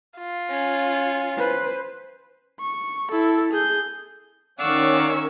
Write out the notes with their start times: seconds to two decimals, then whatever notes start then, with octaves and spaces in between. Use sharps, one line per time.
0.18 F4
0.50 C#4
1.37 B4 C5
2.60 C#6
3.12 E4 A4
3.52 G#4 G6
4.59 D#3 C#4 D5 F5 F#5 C#6 E6